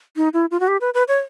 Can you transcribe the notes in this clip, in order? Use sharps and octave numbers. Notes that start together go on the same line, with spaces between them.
D#4
E4
F4
F#4
G4
B4
B4
C#5